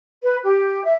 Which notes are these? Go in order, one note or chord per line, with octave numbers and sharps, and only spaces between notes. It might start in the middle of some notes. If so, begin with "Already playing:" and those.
B4
G4
E5